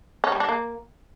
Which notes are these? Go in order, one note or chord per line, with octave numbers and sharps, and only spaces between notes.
C#4
G3
D4
A#3